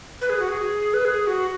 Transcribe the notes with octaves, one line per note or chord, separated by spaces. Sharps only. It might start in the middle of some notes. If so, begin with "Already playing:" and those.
B4
G#4
F#4
G#4
B4
G#4
F#4